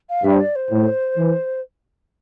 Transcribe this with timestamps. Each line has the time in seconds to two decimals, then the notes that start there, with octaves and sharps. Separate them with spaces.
0.09 F5
0.24 G2 E5
0.34 C5
0.40 D5
0.55 C5
0.71 A2
1.18 E3